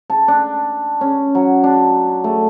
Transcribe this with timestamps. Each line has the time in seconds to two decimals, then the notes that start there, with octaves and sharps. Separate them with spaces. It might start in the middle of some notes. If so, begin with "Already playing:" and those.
0.10 A5
0.28 D4
1.01 C#4
1.35 F#3
1.64 D4
2.24 A3